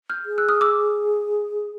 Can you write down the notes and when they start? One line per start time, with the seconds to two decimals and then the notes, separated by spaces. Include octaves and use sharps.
0.10 F6 G6
0.25 G#4
0.38 E6 F#6
0.49 D#6 F6
0.61 D6 E6